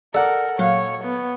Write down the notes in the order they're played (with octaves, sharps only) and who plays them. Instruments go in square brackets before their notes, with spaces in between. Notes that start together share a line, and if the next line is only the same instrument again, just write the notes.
[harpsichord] A4 F#5 [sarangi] A#4 [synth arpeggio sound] D5
[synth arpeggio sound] A#2 F#3 F5 [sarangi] C#5
[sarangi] B3